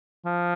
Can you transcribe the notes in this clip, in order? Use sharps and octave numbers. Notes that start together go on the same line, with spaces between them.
F3